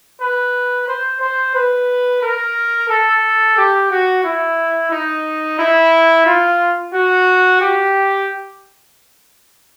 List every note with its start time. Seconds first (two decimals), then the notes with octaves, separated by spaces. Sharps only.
0.21 B4
0.88 C5
1.21 C5
1.55 B4
2.22 A#4
2.89 A4
3.57 G4
3.91 F#4
4.24 E4
4.91 D#4
5.59 E4
6.26 F4
6.93 F#4
7.61 G4